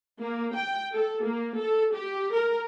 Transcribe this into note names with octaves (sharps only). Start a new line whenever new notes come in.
A#3
G5
A4
A#3
A4
G4
A#4